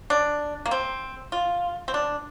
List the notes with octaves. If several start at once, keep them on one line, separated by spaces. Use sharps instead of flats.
D4
A#3
C4
F4
C4
D4